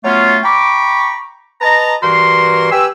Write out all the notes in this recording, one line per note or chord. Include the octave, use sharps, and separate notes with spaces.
F#3 A3 B3 C#4 F4
G5 A#5 B5 C#6 D6
B4 D#5 A5 A#5
G2 E3 F#4 A#4 C6
G4 B4 G#5 E6